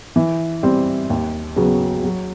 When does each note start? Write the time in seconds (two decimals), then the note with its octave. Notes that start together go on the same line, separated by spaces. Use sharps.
0.16 E3
0.63 G3 C4
1.10 D#2
1.56 C#3 F#3 B3
2.04 F#3